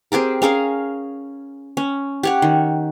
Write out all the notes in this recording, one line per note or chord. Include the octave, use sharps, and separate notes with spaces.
C4 G4 G#4 A#4
C#4 G#4 A#4 F5
C#4
G4 C#5 F#5
D#3